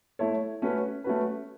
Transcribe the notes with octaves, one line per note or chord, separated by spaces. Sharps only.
A3 E4 A4 C#5
A3 C#4 F#4 B4
A3 C#4 F#4 B4